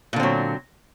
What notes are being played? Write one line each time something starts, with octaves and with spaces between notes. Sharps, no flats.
A#2 D3 F#3 C4